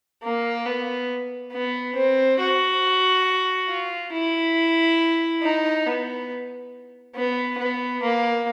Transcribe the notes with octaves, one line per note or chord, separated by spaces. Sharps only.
A#3
B3
B3
C4
F#4
F4
E4
D#4
B3
B3
B3
A#3